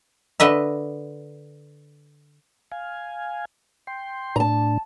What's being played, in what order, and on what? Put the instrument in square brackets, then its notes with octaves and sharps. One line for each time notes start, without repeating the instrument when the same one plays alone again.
[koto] D3 B4 D#5 E5
[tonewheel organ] F5 G#5
G5 C6
[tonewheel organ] A2 D4 [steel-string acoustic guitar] A5 A#5